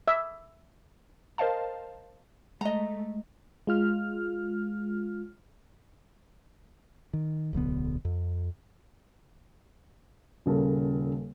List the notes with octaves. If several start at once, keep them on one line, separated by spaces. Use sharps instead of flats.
E5
A#4 C5 D#5 F5 A5
G#3 A3 D#5 A#5
G#3 F4 F6
D#3
D1 B1 D3 B3
F2
D#1 C#3 A4 A#4